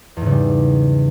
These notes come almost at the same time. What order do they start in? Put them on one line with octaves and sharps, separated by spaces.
E2 G#2 C#3 G3